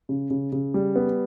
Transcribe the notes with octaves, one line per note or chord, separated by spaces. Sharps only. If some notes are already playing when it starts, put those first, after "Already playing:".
C#3
C#3
C#3
G3
B3